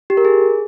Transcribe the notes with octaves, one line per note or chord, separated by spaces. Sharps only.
G4
A#4
G#4